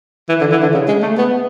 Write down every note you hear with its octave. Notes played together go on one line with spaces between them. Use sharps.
E3
D3
E3
D3
C#3
G#3
A3
B3